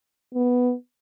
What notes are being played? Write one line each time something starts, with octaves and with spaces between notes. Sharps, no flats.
B3